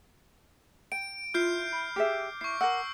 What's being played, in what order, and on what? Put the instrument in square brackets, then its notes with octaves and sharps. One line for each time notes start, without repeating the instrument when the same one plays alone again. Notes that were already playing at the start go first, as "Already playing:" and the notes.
[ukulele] G5 [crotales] D7
[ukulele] E4 [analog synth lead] F4 [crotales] F6 G6 C7
[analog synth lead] B5
[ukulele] G4 G#4 E5 [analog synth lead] D6
[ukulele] E4 [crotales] C#6 C7
[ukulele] A#4 F#5 [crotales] E6